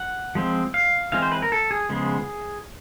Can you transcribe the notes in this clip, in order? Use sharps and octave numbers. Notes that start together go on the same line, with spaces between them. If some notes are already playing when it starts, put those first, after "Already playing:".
Already playing: F#5
F3 G#3 C4
F5
E3 G#3 C4 F5
C5
B4
A#4
A4
G#4
C#3 F3 G#3 B3